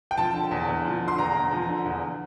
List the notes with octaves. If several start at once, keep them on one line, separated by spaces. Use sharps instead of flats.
G5
F3 A5
D3
E2
E2
F3
D3
C6
E2 A#5
E2
F3
D3
E2